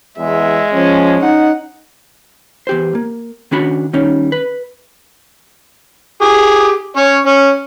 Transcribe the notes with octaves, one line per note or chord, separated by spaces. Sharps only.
E2 G#3 E5
F3 C#4
D#4 F#5
E2 G4 C5
A#3
D#3 C#4 D4 F#4 B5
D#3 G3 C#4 D#4
B4
G4 G#4
C#4 C#5
C#4